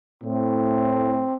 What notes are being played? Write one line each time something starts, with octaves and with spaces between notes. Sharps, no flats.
A2 C4